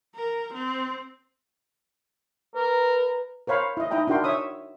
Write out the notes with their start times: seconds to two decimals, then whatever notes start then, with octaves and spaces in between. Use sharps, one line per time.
0.15 A#4
0.53 C4
2.56 A#4 B4
3.47 A#4 C5 C#5 F5 B5
3.77 E4 D#5
3.91 D#4 E4 D#5 G5 A#5
4.07 D4 E4 F#4 A#4 G5 C6
4.24 C#5 E5 D#6